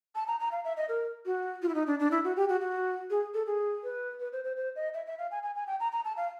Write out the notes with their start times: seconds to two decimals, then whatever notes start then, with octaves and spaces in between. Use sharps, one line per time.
0.15 A5
0.27 A#5
0.40 A#5
0.51 F5
0.64 E5
0.77 D#5
0.89 A#4
1.26 F#4
1.62 F4
1.69 E4
1.74 D#4
1.87 D4
1.99 D4
2.11 E4
2.24 F#4
2.36 G4
2.49 F#4
2.61 F#4
3.10 G#4
3.34 A4
3.46 G#4
3.83 B4
4.20 B4
4.32 C5
4.44 C5
4.56 C5
4.76 D#5
4.94 E5
5.06 E5
5.18 F5
5.31 G#5
5.43 G#5
5.55 G#5
5.67 G5
5.80 A#5
5.92 A#5
6.04 A5
6.17 F5